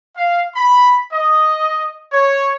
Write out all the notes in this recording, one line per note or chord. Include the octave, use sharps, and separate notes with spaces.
F5
B5
D#5
C#5